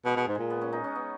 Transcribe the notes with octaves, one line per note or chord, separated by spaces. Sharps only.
B2 G#3
B2
G#2
A#2 G#3
B3
C#4
D#4
C#4
B3